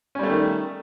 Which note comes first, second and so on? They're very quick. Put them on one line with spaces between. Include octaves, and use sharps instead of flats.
C#4 G3 A3 D#3